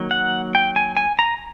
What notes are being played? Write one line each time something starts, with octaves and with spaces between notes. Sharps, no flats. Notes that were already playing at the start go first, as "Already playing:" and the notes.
Already playing: D#3 F#3 A#3
F#5
G5
G#5
G#5
A#5